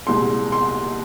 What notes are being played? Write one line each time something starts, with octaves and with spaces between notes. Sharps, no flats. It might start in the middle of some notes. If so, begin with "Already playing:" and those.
C2 A#2 G#3 C6
C6